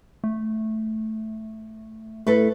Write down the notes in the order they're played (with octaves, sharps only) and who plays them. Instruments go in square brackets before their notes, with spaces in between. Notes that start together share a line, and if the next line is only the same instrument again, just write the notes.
[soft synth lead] A3
[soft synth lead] A3 [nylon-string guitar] E4 A4 B4